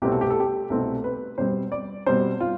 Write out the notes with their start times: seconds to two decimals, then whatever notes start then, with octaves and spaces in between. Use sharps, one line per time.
0.02 C2 B2 A3 C4 G4
0.12 A4
0.21 G4
0.30 A4
0.40 G4
0.70 C2 B2 A3 C4 A4
1.04 B4
1.38 B2 G3 C4 C5
1.72 D5
2.06 B2 G3 C4 C5
2.40 F4